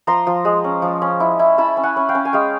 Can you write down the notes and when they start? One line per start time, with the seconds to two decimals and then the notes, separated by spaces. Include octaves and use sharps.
0.07 F3 A#5 C6
0.27 F3
0.45 G#3
0.64 C#4
0.82 F3
1.02 C#4
1.20 E4
1.39 E4
1.58 E4 A5 B5
1.77 C#4
1.83 F#5 G#5
1.96 C#4
2.09 F5 G5
2.15 C#4
2.25 G#5
2.33 G#3 F5 G5